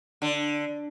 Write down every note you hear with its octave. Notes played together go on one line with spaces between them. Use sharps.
D3